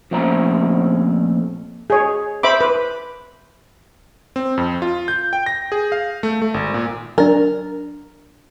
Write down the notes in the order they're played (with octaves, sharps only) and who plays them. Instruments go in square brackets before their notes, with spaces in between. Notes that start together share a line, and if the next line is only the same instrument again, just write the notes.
[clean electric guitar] F2 A#2 A3 C4 C#4 A#5
[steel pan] G#4 C#5
C5 E5 B5 D6
B4
[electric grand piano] C4
F2
F4
G6
G5
A#6
G#4
F5
A3
A3
G#1
A#2
[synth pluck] F#3 D4 [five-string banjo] A#4